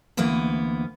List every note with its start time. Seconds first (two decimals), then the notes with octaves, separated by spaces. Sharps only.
0.17 D2 E3 A#3 B3